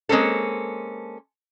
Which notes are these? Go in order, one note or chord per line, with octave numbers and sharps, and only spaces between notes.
G#3 A#3 C4 C#4 A4